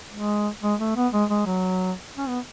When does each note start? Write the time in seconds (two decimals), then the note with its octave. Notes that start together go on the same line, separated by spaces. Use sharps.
0.14 G#3
0.63 G#3
0.80 A3
0.96 B3
1.13 G#3
1.30 G#3
1.46 F#3
2.18 C#4
2.28 B3